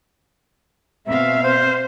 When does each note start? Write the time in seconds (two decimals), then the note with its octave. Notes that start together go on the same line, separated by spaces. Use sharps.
1.06 B2 C4 E5 F5
1.43 C5